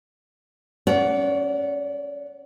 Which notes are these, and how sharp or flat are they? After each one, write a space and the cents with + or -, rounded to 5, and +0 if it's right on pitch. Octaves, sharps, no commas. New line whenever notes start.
C#4 +0 D5 -30 F#5 +0